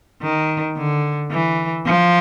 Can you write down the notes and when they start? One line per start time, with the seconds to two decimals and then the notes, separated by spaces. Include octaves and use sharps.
0.22 D#3
0.77 D3
1.31 E3
1.86 F3